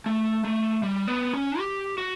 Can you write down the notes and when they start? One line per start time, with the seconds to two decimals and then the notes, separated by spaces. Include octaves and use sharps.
0.06 A3
0.45 A3
0.83 G3
1.08 B3
1.34 C#4
1.59 G4
1.98 F#4